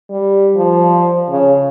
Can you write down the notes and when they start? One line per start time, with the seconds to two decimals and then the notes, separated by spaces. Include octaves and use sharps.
0.10 G3
0.56 F3
1.31 C#3